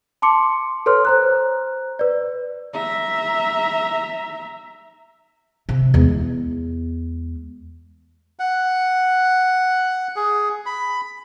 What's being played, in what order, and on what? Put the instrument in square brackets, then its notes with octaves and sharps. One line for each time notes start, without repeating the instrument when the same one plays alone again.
[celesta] A5 C6 D6 C#7
A4 B4 C#5 C6 F6
C5 A#5 F#6
B4 D5
[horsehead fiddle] E5 A#5
[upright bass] C3
E2 G#3
[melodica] F#5
G#4
B5